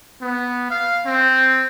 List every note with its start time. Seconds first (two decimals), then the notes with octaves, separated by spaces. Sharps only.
0.21 B3
0.70 F5
1.06 C4